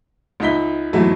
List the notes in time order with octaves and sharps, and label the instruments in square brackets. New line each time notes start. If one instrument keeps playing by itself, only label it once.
[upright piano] C#2 D#4 D#5 E5 B6 G7
B1 E2 G#2 F#3 A3 E4